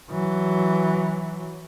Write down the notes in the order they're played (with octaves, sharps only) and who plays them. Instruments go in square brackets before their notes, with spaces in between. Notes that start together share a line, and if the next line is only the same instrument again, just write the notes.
[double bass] E3 F#3